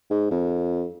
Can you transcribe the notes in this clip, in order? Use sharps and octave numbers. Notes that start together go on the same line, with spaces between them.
G#2
F2